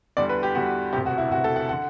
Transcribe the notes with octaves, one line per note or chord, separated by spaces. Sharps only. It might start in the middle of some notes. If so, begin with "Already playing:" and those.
E2 D3 G3 D5
B4
G4
E2 D3 G3 F#4
E1 D2 C3 G4
F#4
E4
E1 D2 C3 F#4
A4
F#5
D3 F#5